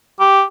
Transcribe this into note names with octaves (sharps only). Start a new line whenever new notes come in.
G4